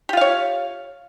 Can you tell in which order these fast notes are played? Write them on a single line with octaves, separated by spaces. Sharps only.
G4 F4 F5 C#5